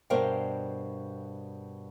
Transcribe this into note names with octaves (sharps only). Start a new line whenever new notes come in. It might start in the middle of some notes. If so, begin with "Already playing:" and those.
G2 B2 A#4 C5 F5 G5